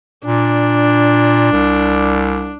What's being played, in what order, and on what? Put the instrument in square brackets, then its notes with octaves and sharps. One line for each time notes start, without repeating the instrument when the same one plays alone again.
[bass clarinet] A#2 [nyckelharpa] D4
[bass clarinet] C2